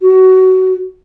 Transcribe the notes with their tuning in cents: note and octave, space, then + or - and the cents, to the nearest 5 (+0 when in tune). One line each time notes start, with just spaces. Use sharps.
F#4 +20